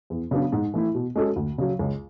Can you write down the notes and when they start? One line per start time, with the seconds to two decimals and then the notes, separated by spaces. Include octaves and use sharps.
0.10 E2
0.31 C#3 F#3 B3 D4
0.52 G#2
0.74 E3 A3 E4
0.94 B2
1.16 G#3 C#4 F#4 A4
1.36 D2
1.58 C#3 F#3
1.79 C#2